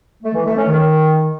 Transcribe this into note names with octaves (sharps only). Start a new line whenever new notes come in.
A3
E3
A3
C#4
D#3